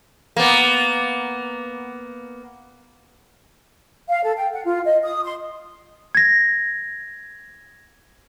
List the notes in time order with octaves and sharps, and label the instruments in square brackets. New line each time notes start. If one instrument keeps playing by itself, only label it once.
[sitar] A#3 B3
[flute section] F5
A4
G5
F#5
F4
D#5
D#6
C6
[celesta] G#6 A#6